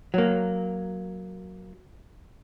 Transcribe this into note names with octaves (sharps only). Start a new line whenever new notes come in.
F#3 A#3